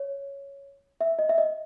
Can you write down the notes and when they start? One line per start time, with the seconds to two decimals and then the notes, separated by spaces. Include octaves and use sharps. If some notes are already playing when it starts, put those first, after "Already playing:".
Already playing: C#5
1.01 E5
1.19 D#5
1.29 E5
1.38 D#5